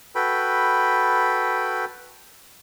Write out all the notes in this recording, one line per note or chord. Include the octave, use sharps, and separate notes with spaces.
F#4 A4 B4 G5 B5